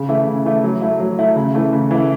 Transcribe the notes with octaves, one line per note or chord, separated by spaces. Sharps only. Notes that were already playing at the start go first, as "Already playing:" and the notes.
Already playing: C#3
E3 A3 E4
C#3
E3 A3 E4
F#3
A3 E4
F#3
A3 E4
C#3
E3 A3 E4
C#3
E3 A3 E4